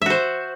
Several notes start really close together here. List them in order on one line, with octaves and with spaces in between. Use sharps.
E5 F#4 C5